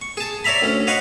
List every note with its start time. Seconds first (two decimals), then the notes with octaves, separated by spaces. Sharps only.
0.02 C#6
0.17 G#4 A5
0.44 C#5 D5 E5 A#5 B5
0.62 D2 C#4
0.87 C#5 D#5 F5 F#5 B5 C#6